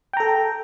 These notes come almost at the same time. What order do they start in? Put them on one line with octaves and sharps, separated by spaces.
G5 A#5 A4